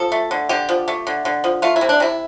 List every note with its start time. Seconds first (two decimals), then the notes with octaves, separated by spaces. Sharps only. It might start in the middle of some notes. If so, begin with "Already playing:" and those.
Already playing: F3 A4
0.12 A3
0.31 D3
0.49 D3 G4
0.69 F3
0.88 A3
1.07 D3
1.25 D3
1.44 F3
1.62 A3 F4
1.76 E4
1.81 C3
1.89 D4
2.00 C3 E4